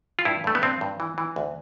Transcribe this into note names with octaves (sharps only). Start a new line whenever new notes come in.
F4
G2 E4
G2 A3
B3
G2 C4
G2
E3
E3
D2